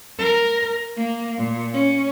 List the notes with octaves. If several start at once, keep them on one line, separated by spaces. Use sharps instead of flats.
A#4
A#3
A#2
C#4